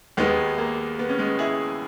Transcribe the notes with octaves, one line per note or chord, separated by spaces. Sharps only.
D#2 D#3 G#3 B3
A#3
B3
C#4
G#3 B3
E4 G#4